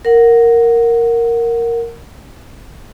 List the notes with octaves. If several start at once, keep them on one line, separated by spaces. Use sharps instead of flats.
A#4 F#5